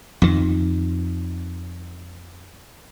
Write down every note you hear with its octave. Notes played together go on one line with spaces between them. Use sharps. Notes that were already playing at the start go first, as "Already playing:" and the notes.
F2 D#3